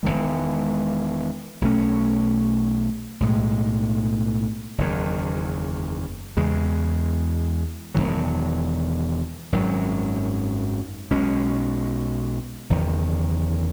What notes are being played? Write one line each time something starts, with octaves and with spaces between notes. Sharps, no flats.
E1 E2 D#3 G#3
B1 B2 A3 C#4
B1 A2 G#3
F#1 E2 D#3
E2 C#3 G#3
E1 D#2 D#3 F#3
G#1 F#2 D#3 F#3
B1 B2 G#3 C#4
F#1 E2 D#3